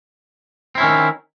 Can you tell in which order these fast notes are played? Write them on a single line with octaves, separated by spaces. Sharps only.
C4 E4 C#4 D#3